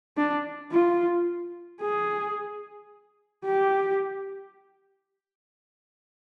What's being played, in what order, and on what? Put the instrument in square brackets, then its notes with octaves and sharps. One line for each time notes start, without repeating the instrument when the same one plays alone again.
[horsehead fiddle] D4
F4
G#4
G4